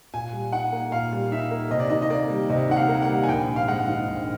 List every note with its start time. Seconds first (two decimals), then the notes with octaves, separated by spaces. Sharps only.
0.14 A#2 G#5
0.33 G3
0.52 D#4 F#5
0.73 A#3
0.92 A#2 F5
1.12 G3
1.31 D#4 E5
1.51 A#3
1.71 C3 D#5
1.80 D5
1.90 D#3 D#5
2.02 D#5
2.10 A#3 D5
2.30 G3
2.49 C3 D#5
2.70 D#3 F#5
2.76 F5
2.89 A#3
3.02 F#5
3.09 G3
3.23 G#5
3.28 A#1 G5
3.48 G#2
3.56 F5
3.68 G#3 F#5
3.88 D#3
4.07 A#1